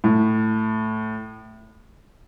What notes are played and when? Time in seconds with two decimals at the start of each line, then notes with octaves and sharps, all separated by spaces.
0.04 A2